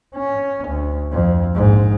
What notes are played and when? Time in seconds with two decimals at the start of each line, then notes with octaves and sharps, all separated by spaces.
0.16 C#4
0.68 D2
1.12 F2
1.54 A#1 G#2